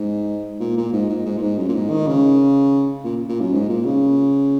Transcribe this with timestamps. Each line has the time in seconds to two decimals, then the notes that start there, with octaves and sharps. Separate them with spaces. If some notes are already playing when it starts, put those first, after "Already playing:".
Already playing: G#2
0.60 A#2
0.77 A#2
0.93 G#2
1.09 G#2
1.26 G#2
1.37 A#2
1.42 G#2
1.58 F#2
1.68 A#2
1.75 G#2
1.90 D#3
2.07 C#3
3.04 A#2
3.29 A#2
3.41 F#2
3.53 G#2
3.69 A#2
3.85 C#3